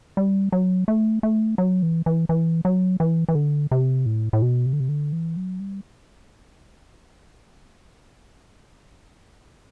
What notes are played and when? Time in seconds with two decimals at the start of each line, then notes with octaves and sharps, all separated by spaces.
0.17 G3
0.52 F#3
0.88 A3
1.23 A3
1.58 F#3
1.82 E3
2.06 E3
2.29 E3
2.65 F#3
3.00 E3
3.28 E3
3.35 D3
3.71 C3
4.06 A2
4.33 A2
4.42 B2
4.66 C3
4.73 D3
4.80 C3
4.89 D3
5.12 E3
5.36 F#3
5.59 G3